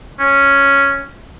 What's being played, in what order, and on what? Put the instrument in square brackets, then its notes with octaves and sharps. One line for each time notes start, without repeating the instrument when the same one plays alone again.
[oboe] C#4